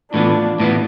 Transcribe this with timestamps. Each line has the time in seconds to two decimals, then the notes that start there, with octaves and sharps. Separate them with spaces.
0.14 A2 E3 B3 D4 F4
0.60 A2 E3 B3